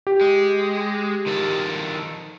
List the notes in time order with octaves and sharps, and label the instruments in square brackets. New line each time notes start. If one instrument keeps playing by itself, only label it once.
[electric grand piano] G4
[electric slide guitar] G#3
D#3 F3 A4